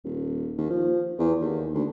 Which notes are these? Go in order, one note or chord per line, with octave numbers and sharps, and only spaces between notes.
D#1
D#2
F3
E2
D#2
D2